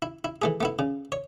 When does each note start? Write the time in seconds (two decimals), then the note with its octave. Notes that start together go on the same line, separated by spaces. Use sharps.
0.02 E4
0.24 E4
0.42 E3 A3 G#4
0.61 A3 B3 E4
0.79 C#3
1.12 C#5